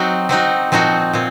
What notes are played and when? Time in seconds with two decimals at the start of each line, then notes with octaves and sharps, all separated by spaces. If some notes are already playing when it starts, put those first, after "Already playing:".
Already playing: F#3 C4 D#4 F#4
0.29 F#3 C4 D#4 F#4
0.72 A#2 F3 C4 D#4 F#4
1.13 A#2 C4